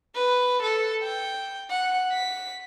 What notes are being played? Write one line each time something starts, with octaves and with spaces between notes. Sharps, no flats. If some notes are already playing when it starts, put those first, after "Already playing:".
B4
A4
G5
F#5
B6